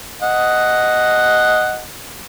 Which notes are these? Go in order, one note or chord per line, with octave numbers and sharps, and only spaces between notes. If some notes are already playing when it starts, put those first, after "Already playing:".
D#5 F#5